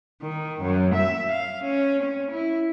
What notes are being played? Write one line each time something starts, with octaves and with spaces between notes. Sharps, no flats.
D#3
F#2
E5
F5
C#4
C#4
E4